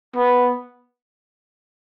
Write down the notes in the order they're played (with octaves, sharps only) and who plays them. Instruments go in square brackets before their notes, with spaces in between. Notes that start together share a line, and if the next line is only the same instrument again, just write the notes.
[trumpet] B3